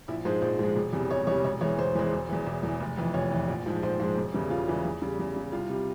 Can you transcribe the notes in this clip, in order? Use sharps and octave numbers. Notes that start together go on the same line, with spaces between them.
A#1 E4
G#2 F3 G#3 C5
A#1 C5
G#2 F3 G#3
E1
E2 C3 G3
E1 C#5
E2 C3 G3 C#5
E1 C#5
E2 E3 G#3 C#5
E1 C5
E2 E3 G#3
E1
E2 E3
E1
E2 E3
F1
F2 E3
F1 C#5
F2 E3
A#1
G#2 F3 G#3
A#1 C5
G#2 F3 G#3 C5
E1
E2 C#3 E3 G3
E1 F4
E2 C#3 E3 G3
E2
C#3 G3
E2
C#3 G3
C2 F4
C3 G3